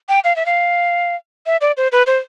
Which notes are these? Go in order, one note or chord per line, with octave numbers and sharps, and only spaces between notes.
G5
F5
E5
F5
E5
D5
C5
B4
C5